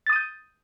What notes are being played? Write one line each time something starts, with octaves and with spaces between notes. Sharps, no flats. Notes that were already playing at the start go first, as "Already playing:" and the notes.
D#6 G6 A6 D#7